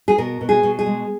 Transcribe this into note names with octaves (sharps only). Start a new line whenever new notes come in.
G#4
B2 A#4
B2
G#4
B2
G#4
G#3